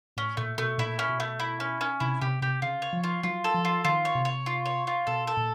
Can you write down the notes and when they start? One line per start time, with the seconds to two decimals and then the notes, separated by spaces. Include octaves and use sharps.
0.17 A2 C#4
0.37 A#2 A3
0.58 B2 A3
0.78 A#2 E4
0.99 C#4
1.09 B2
1.20 A3
1.40 E4
1.60 C#4
1.81 C#4
2.00 C3 E4
2.21 C3 G4
2.42 C3 G4
2.62 C#3 F4
2.82 C#5
2.93 F3
3.04 F4
3.23 F#3 F4
3.44 A4
3.54 F3
3.65 F4
3.85 D#3 F4
4.05 C#5
4.15 C3
4.25 C#5
4.46 F4
4.66 C#5
4.87 F4
5.07 B2 A4
5.27 A4
5.37 A#2